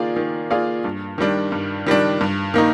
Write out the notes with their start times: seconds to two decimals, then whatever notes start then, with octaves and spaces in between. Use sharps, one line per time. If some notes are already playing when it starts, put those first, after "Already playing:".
Already playing: D#3 A#3 F4 G#4 D5
0.16 D#3
0.50 A#3 F4 G#4 D5
0.84 G2
1.18 D#3 G3 D4
1.52 G2
1.87 D#3 G3 D4
2.21 G2
2.54 D#3 A#3 D#4